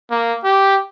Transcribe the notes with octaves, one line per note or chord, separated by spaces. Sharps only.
A#3
G4